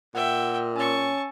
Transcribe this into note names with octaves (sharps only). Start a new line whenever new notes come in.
A#2 E5 F#5 G5
C#4 G#5 A5 C#6 E6